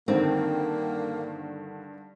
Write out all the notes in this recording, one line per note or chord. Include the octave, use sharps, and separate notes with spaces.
G2 D3 D#3 A#3 C4